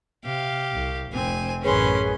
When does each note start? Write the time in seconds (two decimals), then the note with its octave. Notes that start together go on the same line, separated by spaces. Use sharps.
0.25 C3 G4 F5
0.73 C2
1.13 F1 C4 G#5
1.62 A1 F#2 C#4 G#4 B4 C#5 C6